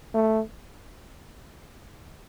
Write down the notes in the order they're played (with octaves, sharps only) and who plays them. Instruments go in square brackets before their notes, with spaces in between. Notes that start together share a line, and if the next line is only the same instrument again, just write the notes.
[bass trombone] A3